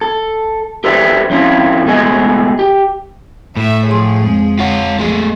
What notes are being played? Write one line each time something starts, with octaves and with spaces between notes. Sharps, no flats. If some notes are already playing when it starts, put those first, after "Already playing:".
A4
G4 A4 B4 C5 D5 E5
F2 F3 C#4 E4 F4
C#2 B2 A3 G#4 D#5
G4
A2 A4 E5
F3 G#4 C#5 C6
F2 G#3 C4
F4 C#5 F#5
A#1 F3 A3 G#4